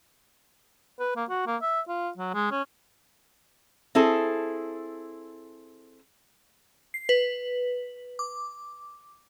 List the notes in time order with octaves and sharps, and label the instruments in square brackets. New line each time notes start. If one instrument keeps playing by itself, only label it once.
[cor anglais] B4
A#3
F#4
A#3
E5
F4
F#3
G#3
C#4
[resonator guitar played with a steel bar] C4 E4 G#4 A4
[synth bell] C7
B4
D6